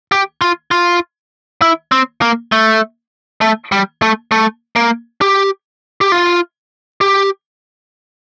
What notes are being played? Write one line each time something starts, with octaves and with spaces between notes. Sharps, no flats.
G4
F4
F4
E4
C4
A#3
A3
A3
G3
A3
A3
A#3
G4
G4
F4
G4